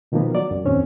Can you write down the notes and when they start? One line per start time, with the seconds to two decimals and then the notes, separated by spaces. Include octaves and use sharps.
0.12 B2 D#3 F3 F#3 A#3 B3
0.34 F#3 D5
0.51 F#2
0.65 E2 A#2 D#3 C4 C#4 C#5